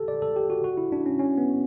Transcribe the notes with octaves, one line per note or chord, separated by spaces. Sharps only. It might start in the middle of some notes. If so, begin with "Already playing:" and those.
Already playing: G4 A4
D5
A4
G4
F#4
F#4
E4
D4
C#4
C#4
B3